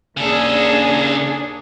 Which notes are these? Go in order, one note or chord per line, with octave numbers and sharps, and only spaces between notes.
D#2 C#3 D4 G#4 A4